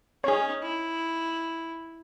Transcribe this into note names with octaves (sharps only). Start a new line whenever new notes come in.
C#4 D#4 G#4 C#5
E4